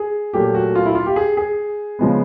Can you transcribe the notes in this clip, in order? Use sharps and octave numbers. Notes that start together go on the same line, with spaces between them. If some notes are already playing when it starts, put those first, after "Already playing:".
Already playing: G#4
A#2 F#3 A3 G4
F#4
F4
E4
F4
G4
G#4
G#4
C#3 F3 G#3 B3